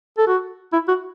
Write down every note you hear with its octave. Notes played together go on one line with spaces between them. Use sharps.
A4
F#4
E4
F#4